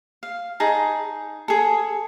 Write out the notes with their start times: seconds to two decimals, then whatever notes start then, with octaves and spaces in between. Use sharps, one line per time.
0.23 F5
0.60 D#4 G#4 A5
1.48 G#4 A4